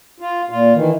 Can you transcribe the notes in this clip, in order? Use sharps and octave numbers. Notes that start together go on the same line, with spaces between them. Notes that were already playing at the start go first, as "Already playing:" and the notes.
F4
A#2 F4
D#3 E3